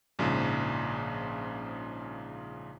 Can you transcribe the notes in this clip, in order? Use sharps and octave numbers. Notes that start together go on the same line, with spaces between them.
A#1 G#2 C#3 F3